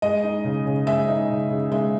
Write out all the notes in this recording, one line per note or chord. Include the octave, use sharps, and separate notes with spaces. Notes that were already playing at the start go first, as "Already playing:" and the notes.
G#3 D#5
D#4
C#3
C#3
G#3 E5
D#4
C#3
C#3
G#3 E5